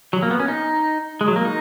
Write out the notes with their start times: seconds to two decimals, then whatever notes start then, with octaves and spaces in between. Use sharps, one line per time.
0.13 F#3
0.22 A#3
0.31 B3
0.40 C#4
0.48 D#4
1.21 G#3
1.28 F#3
1.36 A#3
1.45 D#4